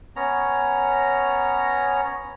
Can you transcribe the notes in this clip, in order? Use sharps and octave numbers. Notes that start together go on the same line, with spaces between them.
B3 C#4 C#5 A#5